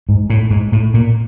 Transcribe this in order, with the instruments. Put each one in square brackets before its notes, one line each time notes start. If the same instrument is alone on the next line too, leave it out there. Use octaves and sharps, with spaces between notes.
[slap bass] G#2
A2
G#2
A2
A#2